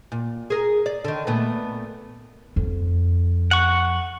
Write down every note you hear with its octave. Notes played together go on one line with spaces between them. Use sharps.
A#2
G#4 A#4
D5
D3 D#3
A#2 A3 B3
F2
F#5 C#6